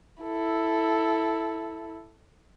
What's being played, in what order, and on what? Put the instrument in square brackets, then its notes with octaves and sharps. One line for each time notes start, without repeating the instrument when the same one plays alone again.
[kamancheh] E4 A4